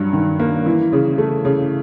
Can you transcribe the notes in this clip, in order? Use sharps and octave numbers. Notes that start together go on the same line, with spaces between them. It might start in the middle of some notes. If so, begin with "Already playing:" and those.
Already playing: G2 F#3
D#3
A#3
E3
C#3
A3
C#3